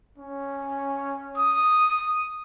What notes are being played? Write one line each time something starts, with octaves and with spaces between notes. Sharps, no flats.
C#4
D#6